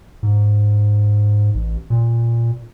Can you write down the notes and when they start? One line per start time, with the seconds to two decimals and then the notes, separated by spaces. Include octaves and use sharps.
0.23 G#2
1.55 A1
1.90 A#2